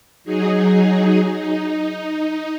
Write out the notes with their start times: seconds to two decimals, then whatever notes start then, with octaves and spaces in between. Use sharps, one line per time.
0.24 F#3 D#4 G#4
1.34 D#4